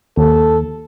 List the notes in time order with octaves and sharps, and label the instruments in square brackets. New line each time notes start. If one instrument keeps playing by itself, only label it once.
[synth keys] D#2 [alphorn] A4